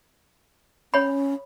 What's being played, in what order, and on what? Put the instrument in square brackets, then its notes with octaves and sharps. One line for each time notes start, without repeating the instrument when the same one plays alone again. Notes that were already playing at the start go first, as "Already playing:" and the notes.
[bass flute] C#4 [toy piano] C#5 B5